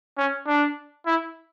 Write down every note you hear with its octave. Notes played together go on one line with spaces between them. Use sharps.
C#4
D4
E4